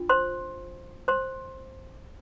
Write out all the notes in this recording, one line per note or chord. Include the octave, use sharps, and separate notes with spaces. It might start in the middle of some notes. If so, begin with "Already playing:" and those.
Already playing: D4 F4
C5 C6
C5 C6